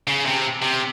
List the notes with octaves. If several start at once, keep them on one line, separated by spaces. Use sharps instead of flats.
C#3
C3
C3